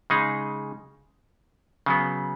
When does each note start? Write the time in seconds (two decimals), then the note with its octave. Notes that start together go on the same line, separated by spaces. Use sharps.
0.10 C#3 G#3 D#4 G#4
1.86 C#3 F#3 B3